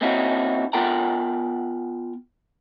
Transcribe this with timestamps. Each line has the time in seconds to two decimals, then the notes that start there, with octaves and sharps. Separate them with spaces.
0.01 A#3 C4 C#4 D#4 E4 F#4
0.73 B3 F4 A#4 F#5 G5 A#5